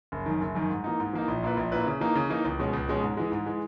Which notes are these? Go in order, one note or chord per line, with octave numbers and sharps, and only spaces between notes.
F#1
F#2 D#3
F#1
F#2 D#3
G#2
E3 A#3 D#4
G#2
E3 A#3 D#4
A#1
A#2 A#3 E4 B4
A#1
A#2 A#3 E4 B4
C#3
E3 A#3 D#4
C#3
E3 A#3 D#4
C#2
B2 G#3 C#4
C#2
B2 G#3 C#4
G#2
E3 G#3
G#2
E3 G#3